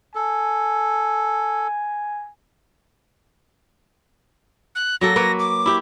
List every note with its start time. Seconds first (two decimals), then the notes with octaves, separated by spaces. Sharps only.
0.15 A4 G#5
4.75 F#6
5.01 F#3 A#3 A4 A#6
5.16 A#3 B4 C#5
5.39 D6
5.66 E4 G4